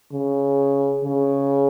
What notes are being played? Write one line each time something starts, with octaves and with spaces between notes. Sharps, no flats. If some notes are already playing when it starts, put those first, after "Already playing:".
C#3
C#3